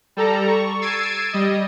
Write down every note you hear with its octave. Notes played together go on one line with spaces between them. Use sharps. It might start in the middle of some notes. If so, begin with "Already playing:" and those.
G3 A4 A#5
C#6
E6 G#6 A6 C7 D7 D#7
G3 D#5